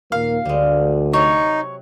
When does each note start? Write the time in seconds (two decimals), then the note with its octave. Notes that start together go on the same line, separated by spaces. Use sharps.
0.12 D#2 A#2 A#3 F5
0.45 D2 G3 G#3
1.13 C3 F#3 D#4 C#5